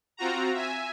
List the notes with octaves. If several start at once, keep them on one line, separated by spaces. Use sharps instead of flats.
C4 F4 F#4 A#5
E5 G#5